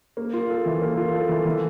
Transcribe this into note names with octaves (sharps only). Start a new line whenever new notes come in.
A#3
F4
A4
E3
A#3
F4
A4
E3
E3